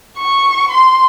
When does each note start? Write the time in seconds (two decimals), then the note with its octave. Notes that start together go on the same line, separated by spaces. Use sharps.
0.18 C#6
0.70 C6